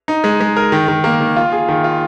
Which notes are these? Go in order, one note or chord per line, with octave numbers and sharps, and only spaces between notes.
D#4
G#3
G#3
A#4
D#3
D#3
A#3
D#3
F4
G#4
D#3
F4